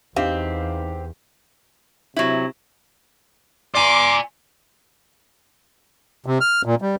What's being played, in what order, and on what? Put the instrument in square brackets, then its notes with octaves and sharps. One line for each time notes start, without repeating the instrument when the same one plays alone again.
[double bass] E2 [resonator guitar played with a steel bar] C4 [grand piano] D#4 F5 [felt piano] G4
[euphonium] C3 [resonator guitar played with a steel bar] F#3 E4
[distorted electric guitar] D5 G#5 [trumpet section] A#5 C6 D6
[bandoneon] C3
F6
A#2
G3